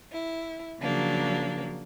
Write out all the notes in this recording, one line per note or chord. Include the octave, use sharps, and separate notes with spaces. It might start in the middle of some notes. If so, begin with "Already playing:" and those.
E4
C#3 F3 F#3 A#3 D4